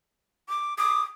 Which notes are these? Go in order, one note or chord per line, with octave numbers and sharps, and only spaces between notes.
D6
D6 D#6